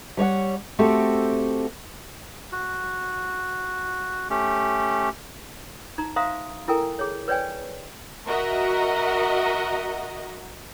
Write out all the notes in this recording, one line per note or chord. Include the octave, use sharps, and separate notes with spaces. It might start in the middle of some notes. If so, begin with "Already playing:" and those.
G3 C#5 D#5 F#5
A3 C4 F#4 G4 A4
F#4
A3 C#4 G4
D#4 A#5
C5 E5 F5 A#5 C6 D#6
E4 A4 A#4 G5 G#5 A#5
G#4 C#5
B4 C#5 D5 G5 G#5
F#4 A#4 D#5 E5 F#5